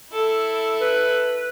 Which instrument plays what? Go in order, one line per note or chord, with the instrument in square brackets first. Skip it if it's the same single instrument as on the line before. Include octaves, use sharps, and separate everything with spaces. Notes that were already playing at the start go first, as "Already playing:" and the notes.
[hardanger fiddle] E4 A4
[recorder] B4